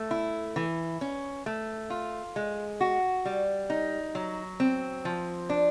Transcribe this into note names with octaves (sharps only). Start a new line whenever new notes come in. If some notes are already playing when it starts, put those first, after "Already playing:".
Already playing: A3
E4
E3
C#4
A3
F4
G#3
F#4
G3
D#4
F#3
C4
F3
D4